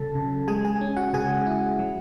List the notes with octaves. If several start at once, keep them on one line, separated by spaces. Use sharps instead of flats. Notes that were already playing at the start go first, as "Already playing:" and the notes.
Already playing: C#3 F#3 C#4 A4 A5
C#3
G#3 G#4 G#5
G#4 G#5
C#4
F#4 F#5
C#3 G#4 G#5
E4
F#3